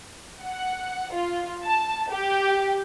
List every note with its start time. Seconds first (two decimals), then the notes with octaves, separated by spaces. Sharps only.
0.42 F#5
1.13 F4
1.64 A5
2.10 G4